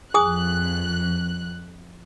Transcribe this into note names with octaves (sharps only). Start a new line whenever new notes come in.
F2 G#4 G#5 D#6 F#6